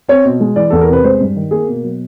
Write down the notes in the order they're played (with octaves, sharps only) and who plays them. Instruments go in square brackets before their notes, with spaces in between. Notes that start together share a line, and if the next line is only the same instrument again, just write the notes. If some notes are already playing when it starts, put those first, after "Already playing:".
[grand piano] C4 C#5
B2
G#3
E3 D5
E2 A4
A#4
C3 B4
G#3 C5
G2
D#3
A#3 G#4
B2
F#3